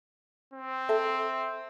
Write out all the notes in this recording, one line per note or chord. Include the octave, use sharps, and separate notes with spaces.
C4
A4 E5